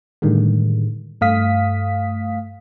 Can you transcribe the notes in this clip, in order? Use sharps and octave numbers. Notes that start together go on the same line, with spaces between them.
A2 D3 D#3 G3 G#3
G2 A3 F5 D#6 B6